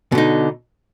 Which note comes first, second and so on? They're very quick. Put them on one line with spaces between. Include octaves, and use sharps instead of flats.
B2 D3 D#4